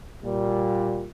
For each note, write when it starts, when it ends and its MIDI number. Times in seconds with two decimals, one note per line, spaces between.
0.23 1.05 46
0.23 1.05 55